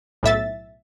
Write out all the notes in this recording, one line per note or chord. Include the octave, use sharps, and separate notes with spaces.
B1 A2 E5 A6